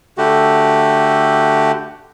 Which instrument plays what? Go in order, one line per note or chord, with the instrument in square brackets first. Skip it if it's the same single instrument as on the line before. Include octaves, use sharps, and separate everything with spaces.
[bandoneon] D3 A3 F#4 G4